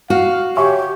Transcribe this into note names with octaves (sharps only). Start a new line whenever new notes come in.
F#4 F5
G4 C#5 E5 G#5 C#6